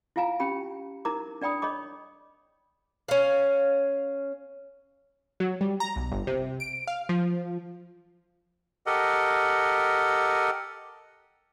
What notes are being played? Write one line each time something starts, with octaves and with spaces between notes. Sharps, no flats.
E4 F4 F5 G#5 A#5
C#4 G4 G5 B5
D#4 E4 A#4 A#5 D6
D4 D5 G5 B5 D#6
C#5 D#5 B5 D6
C#4 F5
F#3
G3
A#5
B1
G1
C3
D7
F5
F3
G4 A4 A#4 D#5 F#5